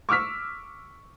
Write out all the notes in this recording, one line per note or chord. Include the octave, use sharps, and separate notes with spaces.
C#6 D6 E6 F6 B6